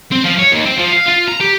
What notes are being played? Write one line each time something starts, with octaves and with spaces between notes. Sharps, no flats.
C4
F3
C#5
D#2
C4
F3
F5
F4
A#5
G4